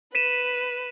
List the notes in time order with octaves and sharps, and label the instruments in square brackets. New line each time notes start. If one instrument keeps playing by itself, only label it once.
[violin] B4 [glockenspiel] B6 D#7 E7